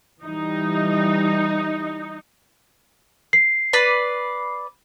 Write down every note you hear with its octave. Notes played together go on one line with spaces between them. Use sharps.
E3 G3 D#4
C7
B4 D5